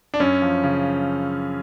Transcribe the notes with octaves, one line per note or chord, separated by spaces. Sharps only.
D4
F#2 C#4
F3
C#3